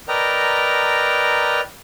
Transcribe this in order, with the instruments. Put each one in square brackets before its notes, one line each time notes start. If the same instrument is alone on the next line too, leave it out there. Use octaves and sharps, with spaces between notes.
[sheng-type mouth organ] A#4 B4 D5 D#5 G5 A#5